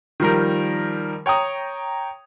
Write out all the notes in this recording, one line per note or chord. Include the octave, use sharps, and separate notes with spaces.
D#3 F3 G3 A#4
C#5 G5 A#5 D#6